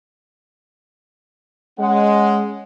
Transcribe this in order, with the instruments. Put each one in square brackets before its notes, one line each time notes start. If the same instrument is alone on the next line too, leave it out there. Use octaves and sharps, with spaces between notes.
[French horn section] G#3 [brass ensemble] C#4 F#5